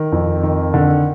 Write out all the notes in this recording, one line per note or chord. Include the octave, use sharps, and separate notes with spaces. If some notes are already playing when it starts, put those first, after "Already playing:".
Already playing: D#3
F2
D#3
D3